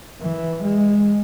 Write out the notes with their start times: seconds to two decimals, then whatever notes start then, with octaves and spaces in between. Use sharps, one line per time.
0.21 E3
0.64 G#3